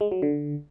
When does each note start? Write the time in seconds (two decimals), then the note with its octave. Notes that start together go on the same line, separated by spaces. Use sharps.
0.01 G#3
0.12 F#3
0.22 D3